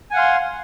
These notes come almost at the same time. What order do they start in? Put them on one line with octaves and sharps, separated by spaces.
G#5 F#5 F5 C6